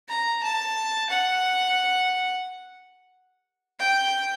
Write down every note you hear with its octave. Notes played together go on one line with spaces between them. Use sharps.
A#5
A5
F#5
G5